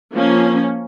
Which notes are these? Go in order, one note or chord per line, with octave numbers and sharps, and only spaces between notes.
F3 A#3 C#4